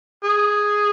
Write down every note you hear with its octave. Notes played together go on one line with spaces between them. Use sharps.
G#4